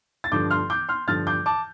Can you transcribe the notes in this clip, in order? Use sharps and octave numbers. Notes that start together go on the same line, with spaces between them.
A6
G2 D3 F3 D6 G6
C6 F6
D6 G6
C6 F6
G2 D3 F3 F6 A6
D6 G6
A5 D6